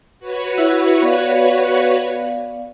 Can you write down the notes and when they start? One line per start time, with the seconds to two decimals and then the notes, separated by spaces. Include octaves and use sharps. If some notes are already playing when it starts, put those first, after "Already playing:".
0.19 F#4 B4 C#5
0.58 E4 E5
1.02 B3 D5 F5